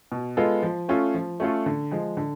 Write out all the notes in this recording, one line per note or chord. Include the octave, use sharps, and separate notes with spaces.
B2
G#3 B3 F4 A4
F3
A3 C#4 F4 A4
F3
A3 C#4 F4 A4
D3
F3 G#3
D3